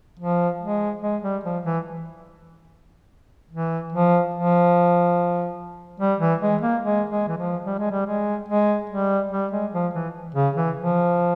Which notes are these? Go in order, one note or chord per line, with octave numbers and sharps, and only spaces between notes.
F3
G#3
G#3
G3
F3
E3
E3
F3
F3
G3
E3
G#3
A#3
G#3
G#3
E3
F3
G3
G#3
G3
G#3
G#3
G3
G3
G#3
F3
E3
C#3
E3
F3